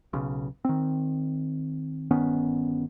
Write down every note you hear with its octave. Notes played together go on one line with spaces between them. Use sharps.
B1 C#3
D#3 C4
G1 D#3 B3 C#4